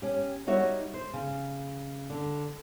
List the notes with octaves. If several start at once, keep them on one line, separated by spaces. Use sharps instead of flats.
C#4 G4
G3 D#4 F#4 C#5 E5
C5
C#3
D3